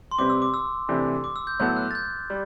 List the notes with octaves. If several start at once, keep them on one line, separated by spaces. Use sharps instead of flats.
C6
C3 G3 C4 G4 B4 D6
E6
D6
E6
C3 E3 A3 D4 G4
D6
E6
G6
A2 F#3 B3 F#4 A4 G6
F#6
A6
G6
G3